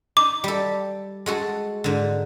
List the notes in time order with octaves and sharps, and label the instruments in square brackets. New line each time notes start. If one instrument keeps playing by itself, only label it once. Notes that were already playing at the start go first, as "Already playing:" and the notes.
[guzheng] D#4 [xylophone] D6
[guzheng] G3 A4
G#3 F#4 A4
G#2 D3